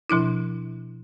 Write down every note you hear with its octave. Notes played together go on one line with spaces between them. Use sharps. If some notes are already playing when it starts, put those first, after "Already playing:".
B2 F3 D4 E4